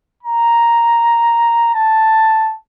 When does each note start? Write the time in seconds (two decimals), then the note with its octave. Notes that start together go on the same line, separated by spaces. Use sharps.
0.23 A#5
1.74 A5